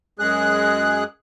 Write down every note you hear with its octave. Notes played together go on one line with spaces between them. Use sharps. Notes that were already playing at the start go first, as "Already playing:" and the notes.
F#2 G#3 G#4 F#6